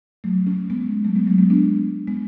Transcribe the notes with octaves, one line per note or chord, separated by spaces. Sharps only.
F#3 A3
A3 C#4
G#3 B3
G#3
F#3 A3
G#3 B3
F#3 A3
G#3 B3
B3 D4
G#3 B3